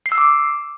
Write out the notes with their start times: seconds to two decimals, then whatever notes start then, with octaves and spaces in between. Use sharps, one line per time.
0.06 C7
0.12 E6
0.18 D6